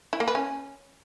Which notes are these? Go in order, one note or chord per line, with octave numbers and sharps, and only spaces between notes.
E4
A#3
B4
C#4